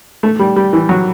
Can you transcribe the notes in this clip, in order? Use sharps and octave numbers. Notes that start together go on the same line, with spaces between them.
A3
G3
G3
E3
F#3